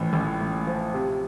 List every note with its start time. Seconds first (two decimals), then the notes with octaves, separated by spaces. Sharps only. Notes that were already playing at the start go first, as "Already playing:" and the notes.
Already playing: A1 A2 F3
0.13 A1
0.40 A2
0.67 F3
0.94 C3